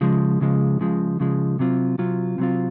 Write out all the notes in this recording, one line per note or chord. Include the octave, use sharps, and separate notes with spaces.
C#2 C#3 F3 G#3
C#2 C#3 F3 G#3
C#2 C#3 F3 G#3
C#2 C#3 F3 G#3
C3 F#3 C4 F4
C3 F#3 C4 F4
C3 F#3 C4 F4